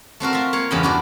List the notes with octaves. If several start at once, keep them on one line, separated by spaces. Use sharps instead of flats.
A3 C4 F#4 A#4
F4 E5
A#3 C#5
E2 G2 C#3 D#5 G5 B5
D4 F#4 D5